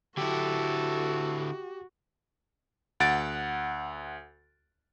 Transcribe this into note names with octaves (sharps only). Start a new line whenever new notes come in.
D3 E4 F#4 G4 A4
D2 F#5 A6 D7